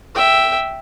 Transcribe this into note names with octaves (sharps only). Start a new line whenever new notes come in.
E5 G5